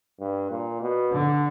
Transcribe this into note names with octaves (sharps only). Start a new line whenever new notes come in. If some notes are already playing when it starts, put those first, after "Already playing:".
G2
A#2
B2
D3